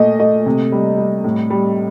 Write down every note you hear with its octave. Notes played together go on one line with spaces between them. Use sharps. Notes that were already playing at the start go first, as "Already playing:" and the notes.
Already playing: A#2 A3 D#5
A3 D#5
C3
G3
G3
A2
G3